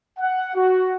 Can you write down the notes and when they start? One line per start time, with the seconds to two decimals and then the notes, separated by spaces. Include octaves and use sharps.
0.19 F#5
0.55 F#4